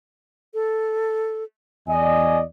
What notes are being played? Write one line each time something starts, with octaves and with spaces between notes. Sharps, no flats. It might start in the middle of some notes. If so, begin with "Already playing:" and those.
A4
E2 D5 D#5 G#5